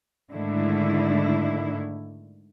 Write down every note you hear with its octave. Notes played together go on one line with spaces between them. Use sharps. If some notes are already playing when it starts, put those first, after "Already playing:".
G#2 D3 D#3 A3 E4